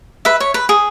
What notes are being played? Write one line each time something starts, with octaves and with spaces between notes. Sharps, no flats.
B4 E5
C#5
B4
G#4